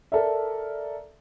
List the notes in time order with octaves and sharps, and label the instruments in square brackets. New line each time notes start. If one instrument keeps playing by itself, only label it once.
[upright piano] A4 A#4 D5 E5